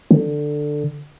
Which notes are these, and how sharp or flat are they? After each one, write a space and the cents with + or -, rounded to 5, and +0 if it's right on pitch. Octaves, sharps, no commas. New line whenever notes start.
D3 +10